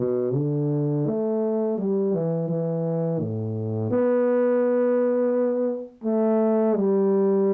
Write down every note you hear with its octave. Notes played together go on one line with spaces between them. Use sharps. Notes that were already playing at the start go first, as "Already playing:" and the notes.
Already playing: B2
D3
A3
G3
E3
E3
A2
B3
A3
G3